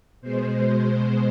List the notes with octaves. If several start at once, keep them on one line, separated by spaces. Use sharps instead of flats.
B2 G#3 C5